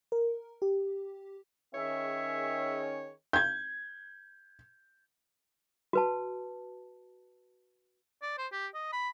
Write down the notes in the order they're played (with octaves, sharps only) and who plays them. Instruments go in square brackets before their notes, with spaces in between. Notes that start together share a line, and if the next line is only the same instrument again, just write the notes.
[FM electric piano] A#4
G4
[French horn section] D#3 C#4 G#4 [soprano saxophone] C#5 [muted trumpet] E5
[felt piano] G6 G#6
[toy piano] F#4 B4 A5
[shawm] D5
C5
G4
D#5
B5